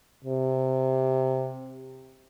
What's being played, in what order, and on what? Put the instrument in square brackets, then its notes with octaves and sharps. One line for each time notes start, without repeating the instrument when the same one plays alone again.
[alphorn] C3